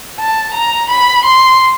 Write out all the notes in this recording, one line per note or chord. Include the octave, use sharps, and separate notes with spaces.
A5
A#5
B5
C6